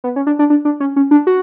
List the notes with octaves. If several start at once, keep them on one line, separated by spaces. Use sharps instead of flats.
B3
C#4
D4
D4
D4
D4
C#4
C#4
D4
F#4